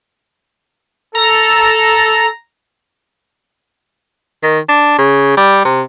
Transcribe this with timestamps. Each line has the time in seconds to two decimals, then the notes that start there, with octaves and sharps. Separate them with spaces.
1.15 A4 A#5
4.43 D#3
4.69 D4
4.98 C#3
5.37 G3
5.65 C3